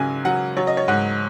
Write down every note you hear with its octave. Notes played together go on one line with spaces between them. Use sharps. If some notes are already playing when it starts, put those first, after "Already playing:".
Already playing: G#2 C#3 F#3 G#5
F#3 F#5
F#3 C#5
D#5
C#5
G#2 F#5